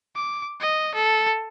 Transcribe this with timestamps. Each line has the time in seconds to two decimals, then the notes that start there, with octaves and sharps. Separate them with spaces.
0.16 D6
0.60 D#5
0.94 A4